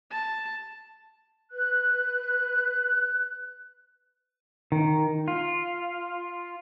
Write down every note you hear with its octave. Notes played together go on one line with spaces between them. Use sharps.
A5
B4 F#6
D#3
F4